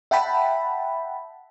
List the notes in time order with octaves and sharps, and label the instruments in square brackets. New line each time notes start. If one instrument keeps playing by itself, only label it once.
[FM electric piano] E5 F#5 G5 A5 B5